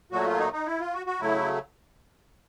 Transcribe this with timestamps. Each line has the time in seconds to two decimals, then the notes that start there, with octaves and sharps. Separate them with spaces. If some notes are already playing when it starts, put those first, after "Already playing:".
0.11 A#2 F#3 A3 F#4
0.25 F4
0.38 D#4
0.53 D#4
0.66 E4
0.80 F4
0.93 F#4
1.06 F#4
1.20 C#3 F#3 A3 E4